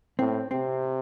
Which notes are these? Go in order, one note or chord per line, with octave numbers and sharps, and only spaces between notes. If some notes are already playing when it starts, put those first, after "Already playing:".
A2 C4
C3 C4